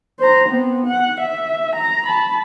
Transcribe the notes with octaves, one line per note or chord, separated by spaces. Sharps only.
C5 A#5
B3 C4
F#5
E5
A#5
A5 B5